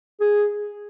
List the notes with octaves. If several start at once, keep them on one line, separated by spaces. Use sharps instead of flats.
G#4